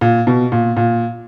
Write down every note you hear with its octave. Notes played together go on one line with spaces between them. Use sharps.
A#2
B2
A#2
A#2